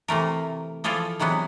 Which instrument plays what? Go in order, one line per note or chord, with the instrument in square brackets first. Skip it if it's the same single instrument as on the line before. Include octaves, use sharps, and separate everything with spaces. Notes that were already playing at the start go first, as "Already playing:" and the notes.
[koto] C3 E3 A3 A#4
E3 F3 F4 G#4 A4 D5
C3 E3 F#3 G#3 B3